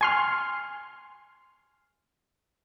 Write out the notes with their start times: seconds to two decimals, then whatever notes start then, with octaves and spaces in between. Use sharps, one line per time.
0.01 G#5 C6 F6